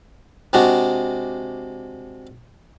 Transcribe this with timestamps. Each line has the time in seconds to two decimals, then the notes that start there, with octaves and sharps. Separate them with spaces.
0.53 C3 G#3 D4 F#4